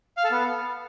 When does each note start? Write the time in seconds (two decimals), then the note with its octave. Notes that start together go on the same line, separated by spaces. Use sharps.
0.17 F5
0.24 A4
0.31 B3